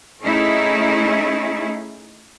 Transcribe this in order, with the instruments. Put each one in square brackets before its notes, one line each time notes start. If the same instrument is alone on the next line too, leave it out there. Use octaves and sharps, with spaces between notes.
[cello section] A3 C#4 D#4 E4 G#4